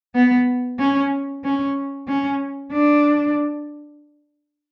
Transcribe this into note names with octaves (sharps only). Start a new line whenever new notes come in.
B3
C#4
C#4
C#4
D4